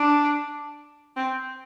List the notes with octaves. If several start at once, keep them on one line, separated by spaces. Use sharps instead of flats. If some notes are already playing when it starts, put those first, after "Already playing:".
Already playing: D4
C4